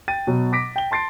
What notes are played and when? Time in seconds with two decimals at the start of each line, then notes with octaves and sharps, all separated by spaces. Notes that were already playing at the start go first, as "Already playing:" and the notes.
0.08 G5 A6 D#7
0.27 B2 F#3
0.52 D6 A#6 B6 D7
0.76 G5 G7
0.91 A5 C6 A6 C7 D7